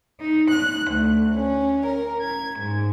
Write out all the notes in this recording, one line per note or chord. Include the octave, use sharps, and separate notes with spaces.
D#4
F#6
D2
C#4
A#4
G#6
G#2